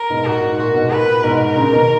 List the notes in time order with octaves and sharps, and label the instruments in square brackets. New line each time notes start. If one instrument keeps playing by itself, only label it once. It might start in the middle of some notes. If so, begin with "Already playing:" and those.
Already playing: [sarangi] A#4
[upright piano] G#2 B2
[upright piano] A#2 [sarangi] F#4
[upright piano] G#2
[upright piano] A#2 [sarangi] F#4
[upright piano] G#2 B2
[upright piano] A#2 [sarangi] B4
[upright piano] G#2 B2 [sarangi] A#4
[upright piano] A#2 C#3
B2 D#3